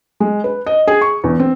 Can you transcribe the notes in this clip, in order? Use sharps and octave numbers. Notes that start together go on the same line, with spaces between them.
G#3
B4
D#5
G#4
C#6
E2
C4